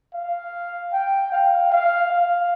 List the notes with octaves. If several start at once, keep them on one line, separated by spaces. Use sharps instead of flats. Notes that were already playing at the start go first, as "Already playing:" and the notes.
F5
G5
F5
F5
F5